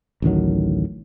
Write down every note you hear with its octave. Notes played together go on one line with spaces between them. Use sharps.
A1 D2 D#3 F#3